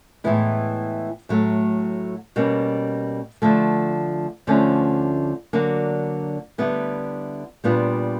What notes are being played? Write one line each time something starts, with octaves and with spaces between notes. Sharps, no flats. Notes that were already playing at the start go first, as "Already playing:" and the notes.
A2 E3 G#3 B3 E4
A2 F#3 A3
B2 G3 A#3 C#4
D3 F3 A3
D2 D3 F3 A3 C#4
D3 F#3 A#3 D4 F#4
D3 G3 B3 E4
A#2 G3 B3 D4 F4